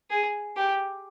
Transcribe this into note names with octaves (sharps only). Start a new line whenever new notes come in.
G#4
G4